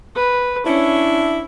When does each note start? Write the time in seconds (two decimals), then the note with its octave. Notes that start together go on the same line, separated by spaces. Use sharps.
0.16 B4
0.66 C#4 D4 E4